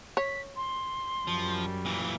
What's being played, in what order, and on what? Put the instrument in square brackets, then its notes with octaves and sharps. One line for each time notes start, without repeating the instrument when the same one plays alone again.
[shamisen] C#5 [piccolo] B6
[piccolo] C6
[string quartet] F#2 G3 [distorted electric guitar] F3
[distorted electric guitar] A#2 E3